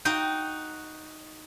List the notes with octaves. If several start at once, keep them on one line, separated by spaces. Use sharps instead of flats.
D#4 F#4 G5